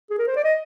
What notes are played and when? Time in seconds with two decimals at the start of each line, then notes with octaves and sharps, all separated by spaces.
0.10 G#4
0.18 A#4
0.27 C5
0.36 D5
0.44 D#5